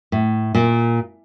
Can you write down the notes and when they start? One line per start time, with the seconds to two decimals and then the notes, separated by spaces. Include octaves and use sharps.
0.12 A2
0.55 A#2